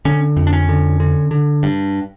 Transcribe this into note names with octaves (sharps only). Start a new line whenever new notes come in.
D3 C#4
F2
D4
C#4
D3
D3
D3
G2